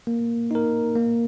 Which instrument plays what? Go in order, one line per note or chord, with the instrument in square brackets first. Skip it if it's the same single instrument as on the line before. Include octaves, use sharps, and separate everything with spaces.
[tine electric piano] A#3
D#4 A#4
A#3